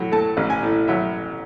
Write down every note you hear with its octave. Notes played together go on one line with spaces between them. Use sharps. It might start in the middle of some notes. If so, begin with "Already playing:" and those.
Already playing: A2 F#3
A3 A5
A1
G#5
A2
F#3 E5